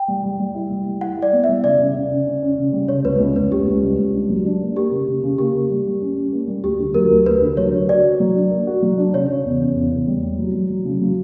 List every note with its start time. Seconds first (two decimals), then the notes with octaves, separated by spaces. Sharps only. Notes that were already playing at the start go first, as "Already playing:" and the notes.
Already playing: G5
0.08 G3
0.23 G3
0.40 G3
0.55 E4
0.70 G3
0.86 G3
1.01 E4 F#5
1.17 E4
1.22 D5
1.32 B3
1.44 E5
1.49 G3
1.64 C#3 D5
1.80 C#3
1.95 C#3
2.11 C#4
2.26 C#4
2.42 C#4
2.58 C#3
2.73 G3
2.88 C#3 C#5
3.04 C#2 B4
3.19 C#2
3.36 C#2 B4
3.51 C#2 G4
3.66 C#2
3.82 G3
3.98 C#2
4.14 D4
4.29 F#3
4.46 D4
4.61 A#3
4.76 A#3 G4
4.91 C#3
5.08 C#3
5.23 C#3
5.38 A#3 G4
5.54 A#3
5.69 G3
5.85 G3
6.01 C#4
6.16 C#4
6.32 A#3
6.47 G3
6.63 D2 G4
6.79 D3
6.94 F#3 A#4
7.11 D2
7.26 D2 B4
7.42 D3
7.57 F#3 C#5
7.73 D3
7.88 F#4 D5
8.05 F#4
8.20 F#3
8.36 D4
8.51 A#3
8.67 F#4
8.82 F#3
8.98 D4
9.14 C#3 C#5
9.30 C#3
9.45 E2
9.60 C#3
9.76 E2
9.92 E2
10.07 G3
10.23 G3
10.39 F#3
10.54 F#3
10.70 F#3
10.85 C#3
11.01 F#3